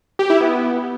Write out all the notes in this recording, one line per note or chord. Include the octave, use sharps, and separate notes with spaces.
G4
E4
B3